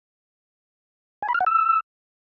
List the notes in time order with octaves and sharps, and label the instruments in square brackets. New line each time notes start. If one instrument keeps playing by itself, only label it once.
[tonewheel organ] G#5
B5
F6
F#5
E6